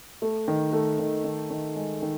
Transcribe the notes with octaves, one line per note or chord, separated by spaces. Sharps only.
A3
D#3
A3
D#3
D#3
D#3
G#3
D#3